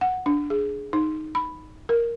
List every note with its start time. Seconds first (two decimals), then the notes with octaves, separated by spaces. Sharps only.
0.01 F#5
0.26 D4
0.50 G#4
0.93 D#4
1.35 B5
1.89 A#4